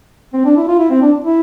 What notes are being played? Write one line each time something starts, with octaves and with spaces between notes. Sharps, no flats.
C4
D4
E4
F4
E4
C4
D4
E4